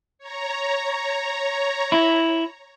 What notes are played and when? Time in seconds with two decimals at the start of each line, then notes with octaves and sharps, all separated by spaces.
0.19 C#5 A#5
1.92 E4